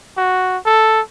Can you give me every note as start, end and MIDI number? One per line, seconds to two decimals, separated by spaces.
0.17 0.58 66
0.66 1.01 69